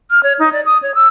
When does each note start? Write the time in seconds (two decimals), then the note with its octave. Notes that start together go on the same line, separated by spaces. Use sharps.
0.11 F6
0.23 C#5
0.39 D#4
0.53 D5
0.66 D#6
0.83 C#5
0.95 E6